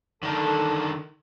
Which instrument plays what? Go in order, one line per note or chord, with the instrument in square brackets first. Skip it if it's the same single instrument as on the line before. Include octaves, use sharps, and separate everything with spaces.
[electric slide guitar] D3 D#3 [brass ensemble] A4